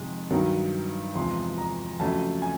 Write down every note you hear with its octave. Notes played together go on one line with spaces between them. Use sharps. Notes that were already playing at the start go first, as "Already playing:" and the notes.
Already playing: F2 C3 D#3 G#3
G2 D#3 F#3
E2 C3 F3 G#3 C6
A#5
F2 C#3 F#3 A3 A5
G#5